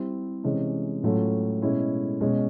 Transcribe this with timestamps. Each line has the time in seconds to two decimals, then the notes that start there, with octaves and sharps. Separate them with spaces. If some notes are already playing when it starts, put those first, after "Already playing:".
Already playing: G3 C4 E4
0.44 C3 E3 G#3 C#4
1.03 A2 F#3 A3 C#4 F4
1.62 B2 G#3 C#4 E4
2.21 B2 G#3 C#4